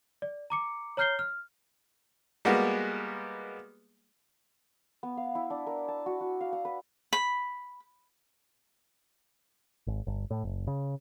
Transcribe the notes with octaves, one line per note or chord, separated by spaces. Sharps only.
D5
A#5 D6 C#7
C#5 A#5 F6 G6 C7 G7
F6
G3 G#3 A#3 B3 F#4
B3
F5
E4
D4
A#4
A5
F#4
F#4
F5
F#5
B4
B5
G#1
G1
A2
F#1
C#3